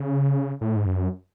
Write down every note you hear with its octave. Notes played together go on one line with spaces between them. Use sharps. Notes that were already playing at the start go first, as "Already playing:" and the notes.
Already playing: C#3
A2
G#2
F#2